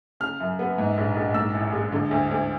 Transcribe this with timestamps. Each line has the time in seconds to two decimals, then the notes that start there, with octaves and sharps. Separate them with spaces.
0.20 C#3 F6
0.40 F#2
0.59 B3
0.78 G#2
0.97 A#1
1.16 A#1
1.34 G#2 E6
1.54 A1
1.73 G#3
1.92 D3
2.11 D2
2.31 D2